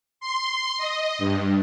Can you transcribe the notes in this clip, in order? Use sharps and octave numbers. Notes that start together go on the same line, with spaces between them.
C6
D#5
G2